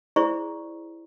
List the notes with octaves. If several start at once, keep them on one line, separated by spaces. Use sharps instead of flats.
E4 G#4 C5 D5 A#5 C#6